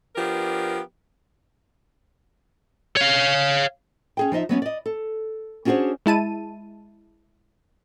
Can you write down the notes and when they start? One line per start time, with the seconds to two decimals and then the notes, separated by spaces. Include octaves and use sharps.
0.16 F3 B3 D4 G4 A#4
2.97 C#5 F5
4.17 C#4 G#4 G5
4.32 F3 D#4 D#5 E5
4.49 F#3 B3 C#4 D5
4.62 D5 D#5
4.86 A4
5.65 C#4 D4 F#4 G#4 C5 C#5
6.06 G#3 E4 A5 D#7